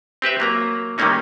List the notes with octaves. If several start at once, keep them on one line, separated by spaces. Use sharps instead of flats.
C4 G4 B4 E5
F#3 A#3 A#5
D#3 G3 A3 A#3 C#4 D#4